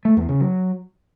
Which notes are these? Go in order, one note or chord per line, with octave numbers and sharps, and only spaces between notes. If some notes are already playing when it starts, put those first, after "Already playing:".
A3
E2
C#3
F#3